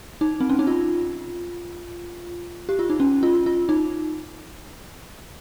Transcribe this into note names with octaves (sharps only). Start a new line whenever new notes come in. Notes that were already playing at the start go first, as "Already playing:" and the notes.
D#4
C4
C#4
D#4
F4
G4
F4
D#4
C#4
F4
F4
D#4